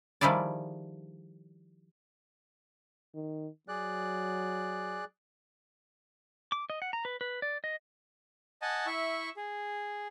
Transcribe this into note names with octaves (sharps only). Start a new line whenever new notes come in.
D#3 F3 G3 E4 G#4 D5
D#3
F#3 G#4 D5 F#6
D6
D#5
F#5
A#5
B4
B4
D5
D#5
D#5 F#5 G#5 A5
E4 E5 C#6
G#4